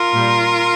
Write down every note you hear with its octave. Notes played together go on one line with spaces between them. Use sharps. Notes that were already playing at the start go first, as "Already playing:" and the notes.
Already playing: F4 A#4
A#2 G3